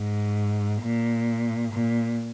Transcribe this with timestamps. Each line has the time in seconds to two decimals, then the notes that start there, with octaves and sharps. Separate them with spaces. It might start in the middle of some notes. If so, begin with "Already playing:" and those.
Already playing: G#2
0.82 A#2
1.73 A#2